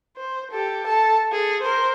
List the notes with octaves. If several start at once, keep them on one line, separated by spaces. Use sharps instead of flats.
C5
G4 A4
A4 A5
G#4 A4
A#4 C5